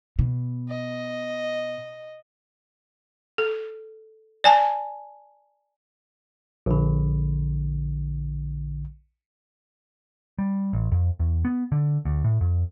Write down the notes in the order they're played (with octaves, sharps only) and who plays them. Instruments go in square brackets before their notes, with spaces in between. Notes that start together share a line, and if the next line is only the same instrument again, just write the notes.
[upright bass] B2
[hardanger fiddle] D#5
[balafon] A4
D5 G#5 A5
[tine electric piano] A#1 D3
[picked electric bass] G3
A1
F2
E2
B3
D3
D2
A2
F2